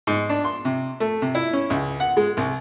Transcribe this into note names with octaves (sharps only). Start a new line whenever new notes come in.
G#2
D4
C6
C3
A3
C3
E4
C#4
C#2
F#5
G#3
C2